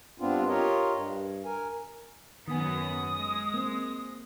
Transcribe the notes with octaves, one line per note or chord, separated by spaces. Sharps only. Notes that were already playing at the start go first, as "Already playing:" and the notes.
G2 B3 C4 D4 F4
F4 G4 A#4 C#5 D#5
G2
A#4 G#5
F#2 D#3 B3 G#5 D#6
G#3
A#3 C4